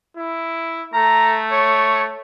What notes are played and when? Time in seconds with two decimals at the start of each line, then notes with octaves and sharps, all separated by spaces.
0.17 E4
0.94 A3 A#5
1.52 C#5